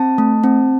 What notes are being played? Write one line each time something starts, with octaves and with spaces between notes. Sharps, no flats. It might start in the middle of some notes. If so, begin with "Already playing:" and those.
Already playing: C4 A5
A3
C4